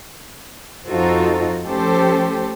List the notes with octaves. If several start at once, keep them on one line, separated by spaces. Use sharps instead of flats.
F2 D#4 F4 F#4 A4 C5
F3 A3 C#4 G4 A4 C5